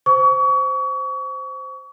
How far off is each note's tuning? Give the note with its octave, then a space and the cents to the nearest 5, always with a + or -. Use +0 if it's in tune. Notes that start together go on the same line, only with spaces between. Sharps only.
C5 -10 C#6 +35